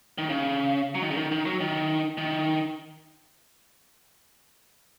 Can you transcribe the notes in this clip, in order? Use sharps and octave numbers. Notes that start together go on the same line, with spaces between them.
D#3
C#3
F#3
D#3
C#3
D#3
D#3
F#3
D#3
D#3